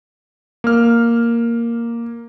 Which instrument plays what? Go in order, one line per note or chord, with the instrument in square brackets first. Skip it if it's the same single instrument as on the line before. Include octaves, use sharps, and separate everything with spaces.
[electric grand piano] A#3 F6